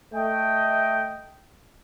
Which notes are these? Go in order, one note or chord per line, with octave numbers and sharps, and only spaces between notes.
A3 D#5 G5